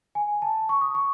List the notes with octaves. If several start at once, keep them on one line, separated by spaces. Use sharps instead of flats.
G#5
A5
C#6
D#6
C#6